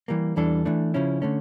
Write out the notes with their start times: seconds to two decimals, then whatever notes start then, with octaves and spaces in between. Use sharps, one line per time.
0.08 E3 G3 A#3
0.36 E2 E3 G3 D4 A4
0.65 E3 A3 D4
0.94 C#3 F3 C#4 E4
1.22 D3 A3 C#4